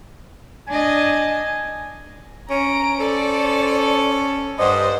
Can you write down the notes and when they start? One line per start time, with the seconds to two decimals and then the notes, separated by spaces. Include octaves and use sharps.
0.69 D4 D#5 G#5
2.50 C#4 A#5 D7
3.00 A4 C5 D5
4.59 G2 C5 D#5 F#5